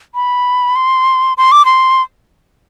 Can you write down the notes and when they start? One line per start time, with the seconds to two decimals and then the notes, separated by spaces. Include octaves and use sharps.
0.15 B5
0.76 C6
1.38 C6
1.52 D6
1.65 C6